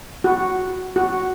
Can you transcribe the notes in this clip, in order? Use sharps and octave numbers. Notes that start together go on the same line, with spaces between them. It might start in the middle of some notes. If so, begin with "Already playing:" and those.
F#4
F#4